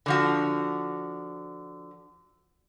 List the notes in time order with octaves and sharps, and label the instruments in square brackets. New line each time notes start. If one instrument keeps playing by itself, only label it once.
[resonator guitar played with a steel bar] D3 F3 F#4